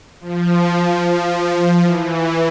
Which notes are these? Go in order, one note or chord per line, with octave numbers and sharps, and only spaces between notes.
F3
E3